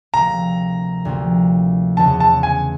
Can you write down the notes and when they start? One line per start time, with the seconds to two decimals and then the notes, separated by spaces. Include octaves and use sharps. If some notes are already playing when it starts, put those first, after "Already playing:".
0.14 D2 C3 F3 A#3 A#5
1.05 D2 C3 F3 A#3
1.96 E2 C#3 E3 A3 D4 A5
2.20 A5
2.43 G#5